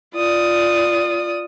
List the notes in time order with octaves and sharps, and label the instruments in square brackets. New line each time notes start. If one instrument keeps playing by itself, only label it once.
[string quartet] F4 D5 D#6